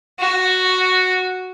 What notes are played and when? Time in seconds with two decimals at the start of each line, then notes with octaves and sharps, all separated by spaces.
0.19 F#4